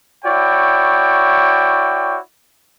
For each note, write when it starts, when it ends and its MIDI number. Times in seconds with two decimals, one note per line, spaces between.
0.24 2.18 64
0.24 2.18 66
0.24 2.18 73
0.24 2.18 74
0.24 2.18 79